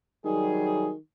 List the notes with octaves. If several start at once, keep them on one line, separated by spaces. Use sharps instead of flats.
D#3 F#3 G3 G#4